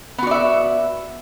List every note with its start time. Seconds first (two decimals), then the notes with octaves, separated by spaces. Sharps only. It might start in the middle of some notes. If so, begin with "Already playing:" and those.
0.18 B3
0.23 F#4
0.27 D5
0.31 E5